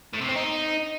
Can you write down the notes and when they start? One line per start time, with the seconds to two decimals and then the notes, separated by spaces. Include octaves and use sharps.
0.13 A2
0.21 C3
0.28 C4
0.36 D#4